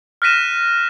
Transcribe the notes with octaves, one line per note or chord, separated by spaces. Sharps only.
F6 F#6 A#6 B6 D#7 E7